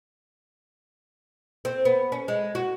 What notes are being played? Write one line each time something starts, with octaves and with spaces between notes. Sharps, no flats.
C4
B3
C#4
G#3
F#4